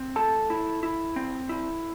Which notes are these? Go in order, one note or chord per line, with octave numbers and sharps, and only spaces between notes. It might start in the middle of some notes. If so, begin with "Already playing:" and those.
Already playing: C4
A2 A4 A5
E4
E4
C4
E4